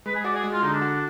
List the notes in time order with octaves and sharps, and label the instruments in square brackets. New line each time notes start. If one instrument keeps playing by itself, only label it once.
[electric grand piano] G#3 [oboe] B4
[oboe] G#4
[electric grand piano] F#4 [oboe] D5
[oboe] G#4
[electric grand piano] G#3
[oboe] F4
[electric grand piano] D3 [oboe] D#4
[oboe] D4
[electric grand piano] F#4